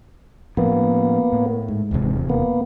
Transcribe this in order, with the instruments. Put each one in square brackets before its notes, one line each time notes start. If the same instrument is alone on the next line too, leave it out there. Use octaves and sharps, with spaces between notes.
[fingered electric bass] A2 F3 [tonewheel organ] A#3 B3
[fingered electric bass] A2
[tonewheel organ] G#2
[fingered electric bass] D#1 E2 C3
[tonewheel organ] A#3 B3